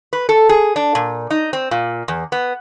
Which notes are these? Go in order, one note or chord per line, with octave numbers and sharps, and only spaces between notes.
B4
A4
G#4
D4
A#2
D#4
C4
A#2
E2
B3